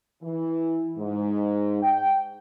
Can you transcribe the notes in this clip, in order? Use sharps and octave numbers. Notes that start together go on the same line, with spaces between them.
E3
G#2
G5